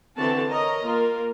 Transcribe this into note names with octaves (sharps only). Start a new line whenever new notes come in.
D3 E3 C4 F#4 A4 A5
A#4 C#5 D#5 A#5
A#3 F4 A#4